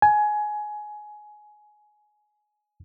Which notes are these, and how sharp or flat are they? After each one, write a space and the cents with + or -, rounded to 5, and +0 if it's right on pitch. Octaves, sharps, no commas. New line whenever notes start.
G#5 +15